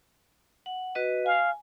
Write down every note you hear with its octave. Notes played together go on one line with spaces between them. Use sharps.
F#5
F#4 B4 D#5
F5 G#5